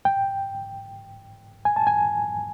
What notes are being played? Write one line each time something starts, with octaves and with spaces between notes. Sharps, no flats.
G5
G#5
A5
G#5